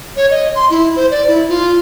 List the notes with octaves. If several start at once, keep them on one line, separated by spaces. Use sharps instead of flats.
C#5
D#5
C6
E4
C5
D5
E4
F4